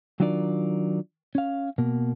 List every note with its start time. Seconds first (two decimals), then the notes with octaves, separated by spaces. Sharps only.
0.20 D#3 F#3 D4 F4 A#4 D5
1.35 C#4 F5
1.78 B2 A#3